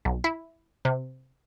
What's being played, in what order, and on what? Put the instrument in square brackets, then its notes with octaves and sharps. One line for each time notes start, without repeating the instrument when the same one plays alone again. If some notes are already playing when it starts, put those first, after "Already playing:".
[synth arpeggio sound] B1
E4
C3